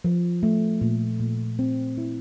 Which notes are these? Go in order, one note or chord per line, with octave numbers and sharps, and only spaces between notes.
F3
A3
A#2
A#2
C4
E4